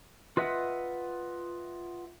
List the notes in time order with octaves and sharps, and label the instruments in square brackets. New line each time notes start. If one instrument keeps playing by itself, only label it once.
[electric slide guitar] F4 B4 D#5 E5 F#5